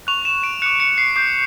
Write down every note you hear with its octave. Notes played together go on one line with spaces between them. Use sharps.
C#6 F#6 F7
E7
D7
D6 F#6 C#7
C#7
C7
D6 G6 C7